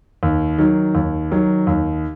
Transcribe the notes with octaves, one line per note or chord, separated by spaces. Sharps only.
D#2
D#3 F#3
D#2
D#3 F#3
D#2